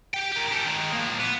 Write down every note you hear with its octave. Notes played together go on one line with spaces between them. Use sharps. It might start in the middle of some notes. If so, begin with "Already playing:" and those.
G4 G5
G4 A#4
G4 A4
D#3 G#3
F3 A#3
B3